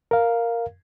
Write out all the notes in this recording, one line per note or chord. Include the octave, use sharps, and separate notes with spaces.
A#4 F5